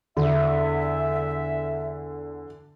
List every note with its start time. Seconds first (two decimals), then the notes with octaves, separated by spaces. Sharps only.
0.17 E2 D3 E5